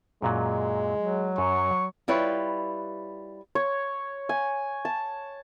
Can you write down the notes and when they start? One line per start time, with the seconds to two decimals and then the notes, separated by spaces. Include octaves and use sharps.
0.22 F#2 A#2 F#3 G#3
0.97 F#3
1.38 F#2 C#6
2.08 G3 E4 F4 B4 C#5
3.55 C#5
4.29 G#5
4.85 A5